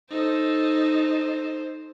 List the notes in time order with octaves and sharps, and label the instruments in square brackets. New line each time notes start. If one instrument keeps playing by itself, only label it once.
[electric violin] D#4 A4 [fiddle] C5